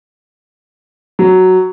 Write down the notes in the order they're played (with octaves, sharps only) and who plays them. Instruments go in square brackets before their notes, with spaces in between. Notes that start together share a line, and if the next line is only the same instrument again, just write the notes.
[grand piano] F#3